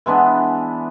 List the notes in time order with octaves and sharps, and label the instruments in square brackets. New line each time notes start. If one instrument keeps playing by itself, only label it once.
[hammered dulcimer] E3 G#3 B3 D4